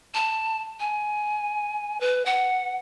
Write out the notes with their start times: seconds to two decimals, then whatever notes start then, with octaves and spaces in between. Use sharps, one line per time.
0.14 A5
0.80 G#5
2.00 B4
2.25 F#5